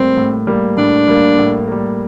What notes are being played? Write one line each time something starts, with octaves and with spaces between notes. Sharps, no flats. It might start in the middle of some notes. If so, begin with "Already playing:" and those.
Already playing: A2 G3 A#3 C4
A2
G3 A#3
A2 D4
G3 A#3
A2
G3 A#3